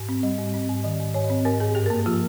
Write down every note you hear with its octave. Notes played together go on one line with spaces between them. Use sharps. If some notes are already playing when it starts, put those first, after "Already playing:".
Already playing: G#2
C4
G3 D#5
G#2
C4
G#2
D#3 D#5
G#2
G#2 C#5
D#5
C4
G#2 A#4
G#2 G#4
G2 G4
A#4
A#3
F3 F4